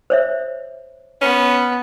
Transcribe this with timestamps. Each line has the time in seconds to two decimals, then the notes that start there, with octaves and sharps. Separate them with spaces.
0.10 C5 C#5 E5
1.21 B3 C#4